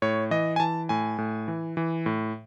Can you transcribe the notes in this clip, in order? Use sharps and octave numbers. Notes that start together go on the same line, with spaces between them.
A2 C#5
E3 D#5
G#5
E3 A5
A2 G#5
A2
E3
E3
A2